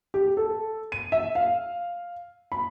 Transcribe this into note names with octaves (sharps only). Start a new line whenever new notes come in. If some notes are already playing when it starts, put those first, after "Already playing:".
G4
A4
D#7
E5
F5
B5